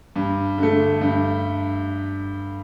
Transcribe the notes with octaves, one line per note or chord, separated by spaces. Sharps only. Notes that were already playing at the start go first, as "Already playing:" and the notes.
G2
D3 A3
G2